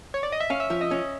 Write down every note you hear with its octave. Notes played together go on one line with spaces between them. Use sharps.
C#5
D5
D#5
E5
C#4 F5
E5
F3 E5
D#5
C#4